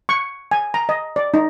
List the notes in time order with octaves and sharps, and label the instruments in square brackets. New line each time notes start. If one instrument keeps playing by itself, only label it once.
[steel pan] C#6
G#5
A#5
D#5
D5
D#4